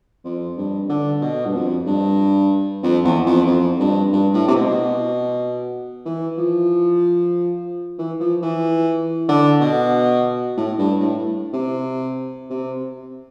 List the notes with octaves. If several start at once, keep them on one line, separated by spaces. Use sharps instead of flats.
F2
G2
D3
B2
G2
F2
G2
F2
E2
F2
F2
G2
G2
A2
C3
B2
E3
F3
E3
F3
E3
D3
B2
A2
G2
A2
C3
C3